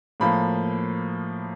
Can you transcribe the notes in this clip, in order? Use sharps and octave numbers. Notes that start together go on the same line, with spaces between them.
A2 F3 A#3 B5